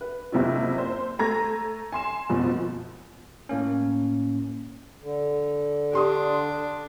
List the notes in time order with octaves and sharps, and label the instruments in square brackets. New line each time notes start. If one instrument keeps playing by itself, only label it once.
[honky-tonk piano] B4
F#1 C3 E4 F4
C5
A3 A4 A#5 G#6 A#6
G#5 C6 E7
F#1 F2 B2 F3
[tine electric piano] A2 A#3 C#4
[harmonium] D3
[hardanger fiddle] D4 [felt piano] G4 C6 D#6